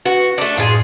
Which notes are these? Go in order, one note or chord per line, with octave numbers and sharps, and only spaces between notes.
F#4 B4
A3 D4
F#2 A2 F4 G#4